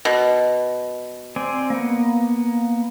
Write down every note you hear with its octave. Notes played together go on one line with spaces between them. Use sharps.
B2
C4 D5 G#5
A#3 B3